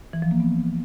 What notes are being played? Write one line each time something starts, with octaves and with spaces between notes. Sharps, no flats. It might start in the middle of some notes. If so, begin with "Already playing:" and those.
E3
F3
A#3
B3